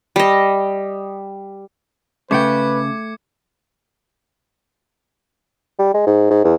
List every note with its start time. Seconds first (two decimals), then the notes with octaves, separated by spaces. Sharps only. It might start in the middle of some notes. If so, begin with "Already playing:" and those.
0.16 G3 D#5
2.31 C#3 A3 B4 G5 D6 G#6 C#7
5.79 G3
5.94 G#3
6.07 G#2
6.30 G#2
6.44 E2